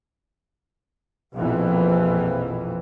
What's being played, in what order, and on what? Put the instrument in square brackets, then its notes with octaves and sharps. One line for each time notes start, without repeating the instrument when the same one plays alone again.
[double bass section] A#1 F2 B2 E3